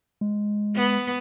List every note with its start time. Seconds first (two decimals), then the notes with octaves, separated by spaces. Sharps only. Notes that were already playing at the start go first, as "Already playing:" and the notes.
0.21 G#3
0.76 B3